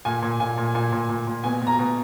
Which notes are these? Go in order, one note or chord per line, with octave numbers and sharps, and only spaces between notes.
A#2 G#5
A#2
A#2 G#5
A#2
A#2 G#5
A#2
A#2
A#2
B2 G#5
B2
A#5
B2